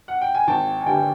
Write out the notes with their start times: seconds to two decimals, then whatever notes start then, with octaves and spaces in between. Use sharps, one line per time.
0.08 F#5
0.21 G5
0.35 G#5
0.47 G#1 G5 A5
0.81 G#5
0.86 G2 D3 G3 G5 A5